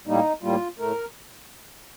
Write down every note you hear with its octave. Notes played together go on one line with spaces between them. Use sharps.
A2 G3 A#3 D#4
A2 G3 A#3 F4
A2 A3 A#4